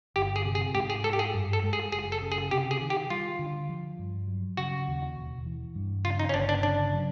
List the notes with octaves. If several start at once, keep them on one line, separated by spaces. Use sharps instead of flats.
G1 G4
G#4
C3
G#4
G#2 G4
G#4
G#3 A4
G4
G#4
G2
A4
G#3
G#4
F#1 G#4
A4
C#3
G#4
C3 G4
G#4
D#3
G4
G3 F4
D3
F3
G2
F#3
C#3 F#4
D#2
E1
E3
G2
C#3 F4
D#4
C#4
G1 D4
D4
C#3 D4
F#3